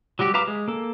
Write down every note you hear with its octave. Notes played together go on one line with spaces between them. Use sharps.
F#3 G3 F#4 G4
B4 E5 F5 A#5 D6
G#3
A#3 A4